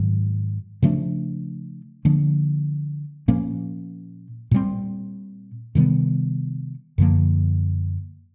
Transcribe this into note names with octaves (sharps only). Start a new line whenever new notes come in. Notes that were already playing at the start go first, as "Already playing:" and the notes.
Already playing: G#2 D#3 F#3
C#3 F3 A3 D4
D3 F3 A#3 D4
A#2 F3 A#3 C#4
A#2 G3 C4
C3 D#3 G3 B3
F#2 D3 F3 A#3